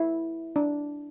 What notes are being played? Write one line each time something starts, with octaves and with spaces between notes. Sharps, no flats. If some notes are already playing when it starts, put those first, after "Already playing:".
Already playing: E4
D4